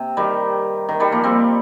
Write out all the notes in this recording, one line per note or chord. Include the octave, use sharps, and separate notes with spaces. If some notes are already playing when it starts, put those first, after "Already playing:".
Already playing: C3
D#3 G3
D#3
D#3 G3
F3 A#3
G3 C4